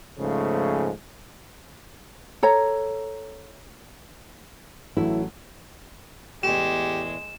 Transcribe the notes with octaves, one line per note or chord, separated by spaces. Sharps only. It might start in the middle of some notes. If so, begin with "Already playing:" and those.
G#2 C#3 F3 A3
A4 C#5 A#5
A1 F#3 A3 E4
E2 A2 G#3 A3 G4 E7